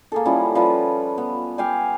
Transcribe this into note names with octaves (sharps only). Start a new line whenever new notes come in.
A#3 G#4 A4
F3 G3 C#4 E4
F3 G3 B4
B3
G4 F5 G5 G#5